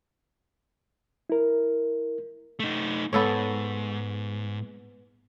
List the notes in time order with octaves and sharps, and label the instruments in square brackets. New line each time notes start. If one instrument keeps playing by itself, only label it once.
[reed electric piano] E4 A#4
[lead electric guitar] A3 D#4
[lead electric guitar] G#2 [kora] B3 A4 C#5